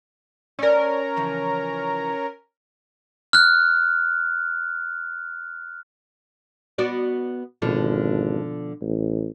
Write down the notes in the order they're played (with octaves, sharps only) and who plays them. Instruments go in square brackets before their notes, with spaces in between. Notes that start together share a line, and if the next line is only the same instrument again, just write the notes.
[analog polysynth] C#4 A#4 [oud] A4 D5
[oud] C#3 E3 F3
[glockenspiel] F6 F#6
[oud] B3 F#4 D5
[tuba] G#1 [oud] B2 D3 F3
[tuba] A1